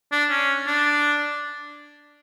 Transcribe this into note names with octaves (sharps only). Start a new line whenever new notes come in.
D4
C#4
D4